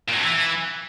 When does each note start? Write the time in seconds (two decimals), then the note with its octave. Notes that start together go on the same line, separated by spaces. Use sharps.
0.08 A#2
0.13 F#3
0.18 F2
0.23 E3